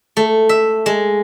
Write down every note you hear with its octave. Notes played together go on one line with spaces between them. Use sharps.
A3
E5
G#3